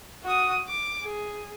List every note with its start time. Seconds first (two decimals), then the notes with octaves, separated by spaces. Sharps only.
0.24 F#4 D#6
0.68 D6
1.03 G#4